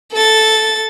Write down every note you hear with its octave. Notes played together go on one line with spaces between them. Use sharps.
A4 A6